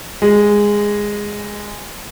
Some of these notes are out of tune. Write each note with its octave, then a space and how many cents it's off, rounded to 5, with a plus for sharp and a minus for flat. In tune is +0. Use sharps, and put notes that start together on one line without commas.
G#3 -10